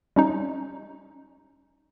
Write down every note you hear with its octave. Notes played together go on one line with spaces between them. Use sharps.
G3 C#4 D#4